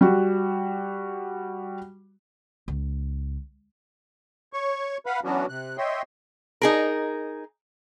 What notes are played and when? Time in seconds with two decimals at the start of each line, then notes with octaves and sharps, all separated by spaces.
0.01 G3 F#4
2.68 C#2
4.53 C#5 C#6
5.06 B4 F5 F#5 B5
5.24 E3 F#3 B3 C#4 D4 F#4
5.49 C3 F#6
5.77 C#5 D#5 E5 G5 C6
6.61 D#4 G#4 A#4